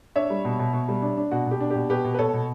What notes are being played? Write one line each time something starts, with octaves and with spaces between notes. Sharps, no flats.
D4 C#5 E5
G3
B2
B2
B2
G3
D4
D4
B2 F#4
B2 G4
D4
B2 G4
B2 G4 B4
B2
B4
B2 A4 C#5
B2